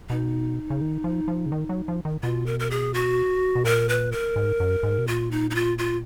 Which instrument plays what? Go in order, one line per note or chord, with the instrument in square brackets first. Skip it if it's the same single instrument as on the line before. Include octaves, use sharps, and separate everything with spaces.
[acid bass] B2 [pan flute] D#4
[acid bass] C#3
D#3
F3
F3
C#3
D#3
F#3
F3
D#3
[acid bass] B2 [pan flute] F4
[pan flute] A#4
A#4
G#4
F#4
[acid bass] B2
[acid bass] A#2 [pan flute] A#4
[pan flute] B4
A#4
[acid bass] G#2
F#2
G#2
B2
[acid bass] A#2 [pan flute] F4
[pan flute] D#4
D#4
F4
F4